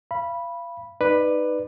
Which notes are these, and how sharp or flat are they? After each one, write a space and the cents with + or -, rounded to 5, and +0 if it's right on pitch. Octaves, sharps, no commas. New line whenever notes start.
F5 -30 B5 -10
D#4 +0 B4 +0 D5 +15